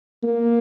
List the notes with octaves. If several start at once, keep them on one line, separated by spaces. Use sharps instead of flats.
A#3